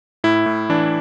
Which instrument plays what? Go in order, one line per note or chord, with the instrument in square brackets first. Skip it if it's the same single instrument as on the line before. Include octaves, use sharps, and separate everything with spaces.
[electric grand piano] A2 E4
A2
E3 D4